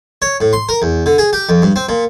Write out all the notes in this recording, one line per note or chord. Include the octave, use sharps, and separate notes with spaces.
C#5
A2
C6
A#4
E2
D3
G#4
G4
F2
G2
C4
A#2